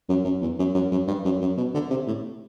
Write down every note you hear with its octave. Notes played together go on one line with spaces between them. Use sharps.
F#2
F#2
E2
F#2
F#2
F#2
G2
F#2
F#2
B2
D3
C3
A2